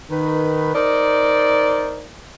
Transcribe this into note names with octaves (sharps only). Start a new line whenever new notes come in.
D#3 B4
D#4 A#4 C5 D5